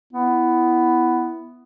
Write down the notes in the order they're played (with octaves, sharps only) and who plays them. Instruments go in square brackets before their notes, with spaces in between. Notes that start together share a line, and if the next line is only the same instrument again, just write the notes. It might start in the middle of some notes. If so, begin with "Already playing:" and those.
[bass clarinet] B3 [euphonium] E4